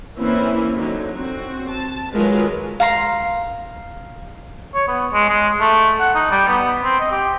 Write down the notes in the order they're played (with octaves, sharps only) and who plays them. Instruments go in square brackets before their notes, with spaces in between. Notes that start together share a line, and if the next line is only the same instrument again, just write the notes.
[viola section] E3 A#3 C4 C#4 E4
D3 F#3 D#4
C4 F#4
A5
D#3 F#3 G#3 F4 A#4 B4
[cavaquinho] F5 A#5 C6
[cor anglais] C#5
B3
G#3
G#3
A3
F#5
D#4
G3
B3
C4
D#5
G4